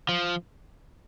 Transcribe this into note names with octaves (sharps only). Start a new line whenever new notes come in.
F3